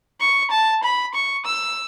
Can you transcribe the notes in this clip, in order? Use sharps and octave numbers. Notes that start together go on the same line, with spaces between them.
C#6
A5
B5
C#6
E6